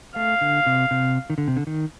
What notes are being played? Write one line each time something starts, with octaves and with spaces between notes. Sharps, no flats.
A3 F5
D3
C3
C3
D#3
D3
C3
D3
D#3